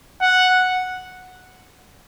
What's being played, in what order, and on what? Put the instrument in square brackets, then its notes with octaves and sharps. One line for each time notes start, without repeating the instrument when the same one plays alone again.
[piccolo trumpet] F#5